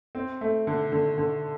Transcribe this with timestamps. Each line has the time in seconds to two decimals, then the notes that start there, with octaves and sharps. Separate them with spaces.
0.15 C4
0.41 A3
0.67 D3
0.92 D3
1.18 D3